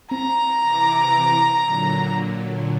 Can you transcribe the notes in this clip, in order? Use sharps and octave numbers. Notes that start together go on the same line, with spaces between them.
C4 A#5
C3 E3 D6
A#2 D3 F#3